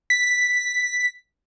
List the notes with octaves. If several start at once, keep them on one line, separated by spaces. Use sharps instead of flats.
B6